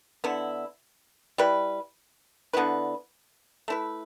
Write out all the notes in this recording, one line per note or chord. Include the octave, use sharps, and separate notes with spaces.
D3 B3 E4
G3 E4 B4
D3 B3 E4 B4
A3 E4 B4